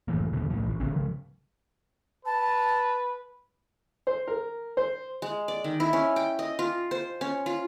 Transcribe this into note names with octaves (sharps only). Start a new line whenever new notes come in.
F#1 A2 E3 A#3
D#2 B2 D3
A2 F3
A1
D3 D#3 B3 C#4
C#3 F3
B4 A5
C5
A#4
C5
G#3
D5
D#3
E4
C#4
G5
D#5
F4
C5
C#4
F4